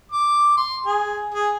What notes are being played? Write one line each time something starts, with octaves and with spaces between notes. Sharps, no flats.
D6
C6
G#4
G#4